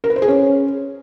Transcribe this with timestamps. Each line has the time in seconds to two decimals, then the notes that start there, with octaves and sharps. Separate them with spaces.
0.04 A#4
0.10 B4
0.16 C5
0.22 G#4
0.28 C#4